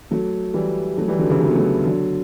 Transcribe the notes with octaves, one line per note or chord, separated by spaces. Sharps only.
F#3 A3
E3 G3
F#3 A3
E3 G3
D3 F#3
C#3 E3
D3 F#3
B3
F#3 A3
D3 F#3